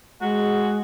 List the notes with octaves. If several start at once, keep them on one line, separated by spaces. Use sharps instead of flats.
G#3 F#4